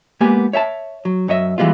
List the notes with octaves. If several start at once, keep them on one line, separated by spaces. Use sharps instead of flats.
G#3 A#3 B3 G4 G#5
C#5 E5 G5 A5
F#3
F#2 C#5 D#5 E5
E3 G3 G#3 B3 F4